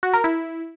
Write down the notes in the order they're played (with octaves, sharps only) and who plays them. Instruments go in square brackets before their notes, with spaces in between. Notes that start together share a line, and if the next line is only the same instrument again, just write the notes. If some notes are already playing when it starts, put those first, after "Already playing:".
[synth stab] F#4
A#4
E4